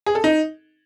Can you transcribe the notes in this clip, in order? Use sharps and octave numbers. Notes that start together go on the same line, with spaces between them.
G#4
A4
D#4